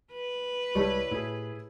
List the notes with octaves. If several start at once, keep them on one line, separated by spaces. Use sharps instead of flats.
B4
C2 G3 G#3 E4 G4 C#5 D5 A5
A2 E4 G#4